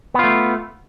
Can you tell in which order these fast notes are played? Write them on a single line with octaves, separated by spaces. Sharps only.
B3 F4 A3